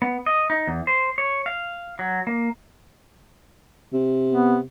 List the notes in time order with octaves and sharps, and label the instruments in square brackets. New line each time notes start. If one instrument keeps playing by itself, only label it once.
[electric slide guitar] B3
D#5
D#4
E2
C5
C#5
F5
F#3
A#3
[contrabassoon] C3
[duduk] B3